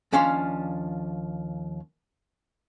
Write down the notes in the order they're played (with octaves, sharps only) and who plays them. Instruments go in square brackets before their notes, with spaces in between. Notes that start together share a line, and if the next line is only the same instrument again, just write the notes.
[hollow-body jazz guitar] D#2 F3 C#4 D4 F5 C6